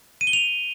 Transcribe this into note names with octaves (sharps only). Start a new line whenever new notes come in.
D#7
G7
F7